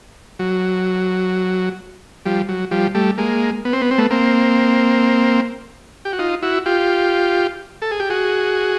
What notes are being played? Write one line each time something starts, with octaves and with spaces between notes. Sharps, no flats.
F#3
F3 G3
F#3
F3 G3
G3 A3
G#3 A#3
B3
C4
B3
C4
A3 B3
A#3 C4
G4
F#4
D#4 F4
E4 F#4
F4 G4
A4
G#4
G4
F#4 G#4